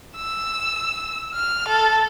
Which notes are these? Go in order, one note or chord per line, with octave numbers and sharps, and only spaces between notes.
E6
F6
A4